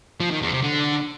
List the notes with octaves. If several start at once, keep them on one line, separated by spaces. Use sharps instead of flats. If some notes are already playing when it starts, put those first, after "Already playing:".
F3
D#3
E2
C3
D3